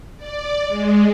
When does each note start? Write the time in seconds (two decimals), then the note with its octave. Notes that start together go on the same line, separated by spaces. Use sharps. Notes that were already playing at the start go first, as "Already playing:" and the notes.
0.17 D5
0.67 G#3